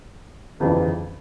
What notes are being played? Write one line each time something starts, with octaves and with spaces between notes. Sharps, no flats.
G1 F2 C#3 E3 G3